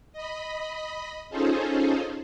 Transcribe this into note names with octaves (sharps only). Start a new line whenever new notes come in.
D#5 B5
C#4 D#4 F4 G#4 A4 C5